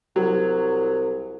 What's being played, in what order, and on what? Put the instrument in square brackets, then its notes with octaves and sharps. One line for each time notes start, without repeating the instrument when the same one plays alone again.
[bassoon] C2 [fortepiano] F#3